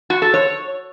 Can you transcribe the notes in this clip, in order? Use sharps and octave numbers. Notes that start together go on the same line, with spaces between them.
F#4
A4
C#5